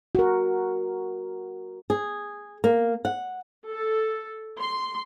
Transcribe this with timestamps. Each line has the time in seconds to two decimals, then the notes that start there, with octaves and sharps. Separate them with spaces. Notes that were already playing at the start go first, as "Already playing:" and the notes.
0.15 F#4 A#4
1.90 G#4
2.64 A#3
3.05 F#5
3.66 A4
4.61 C6